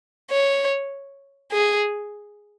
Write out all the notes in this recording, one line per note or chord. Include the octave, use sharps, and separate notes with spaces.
C#5
G#4